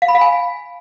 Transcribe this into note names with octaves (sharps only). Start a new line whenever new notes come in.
F5
B5
F5
G#5